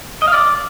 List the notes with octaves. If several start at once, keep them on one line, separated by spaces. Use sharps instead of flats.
D#5
F5
D5